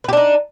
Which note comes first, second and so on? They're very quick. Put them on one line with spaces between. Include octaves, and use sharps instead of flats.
B4 G4 D4 D#4